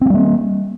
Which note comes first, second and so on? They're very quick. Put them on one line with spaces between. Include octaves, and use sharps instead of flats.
C4 G#3 G3 A#3